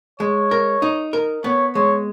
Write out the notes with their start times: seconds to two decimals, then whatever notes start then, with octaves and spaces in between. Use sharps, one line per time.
0.20 G#3 C#5
0.51 A#4
0.82 D#4
1.13 A#4
1.44 B3 C#5
1.75 G#3 C#5